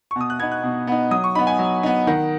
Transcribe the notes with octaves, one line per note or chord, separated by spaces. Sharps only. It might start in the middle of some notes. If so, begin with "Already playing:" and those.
C#6
B2 D#6
F#6
B3 D#4 G#6
F#6
B2
B3 D#4
F#3 D#6
C#6
B3 D#4 B5
G#5
F#3
B3 D#4
D#3 F#5